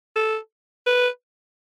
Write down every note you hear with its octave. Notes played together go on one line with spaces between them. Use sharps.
A4
B4